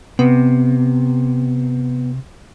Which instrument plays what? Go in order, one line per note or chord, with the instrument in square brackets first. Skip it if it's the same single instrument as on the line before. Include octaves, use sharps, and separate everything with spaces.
[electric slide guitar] C3 [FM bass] B3